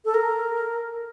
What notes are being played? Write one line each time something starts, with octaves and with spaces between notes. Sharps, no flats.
A4
A#4